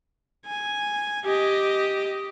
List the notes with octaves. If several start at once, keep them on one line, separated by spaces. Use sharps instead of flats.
G#5
G4 D#5